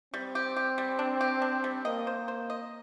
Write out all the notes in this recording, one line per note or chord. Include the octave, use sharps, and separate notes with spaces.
G3 C4
G4
G4
G3
D4
G4
D4
G3
A#3 D#5
C5
C5
D#5